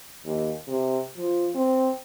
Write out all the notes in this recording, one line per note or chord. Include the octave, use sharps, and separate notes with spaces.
D#2
C3
F3
C4